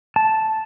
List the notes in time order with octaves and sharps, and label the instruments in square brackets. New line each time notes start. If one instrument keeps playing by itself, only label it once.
[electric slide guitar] A5